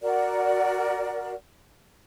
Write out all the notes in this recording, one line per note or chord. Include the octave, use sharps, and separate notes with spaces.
F#4 A#4 D5